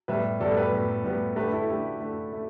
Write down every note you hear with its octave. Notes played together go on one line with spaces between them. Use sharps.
A2 G3 B3 B4 E5
A2 G3 B3 A4 D5
G4 B4
A2 G3 B3
A2 G3 B3
D3 A3 G4 B4
E4 A4
D3 A3 G4
D3 A3
A3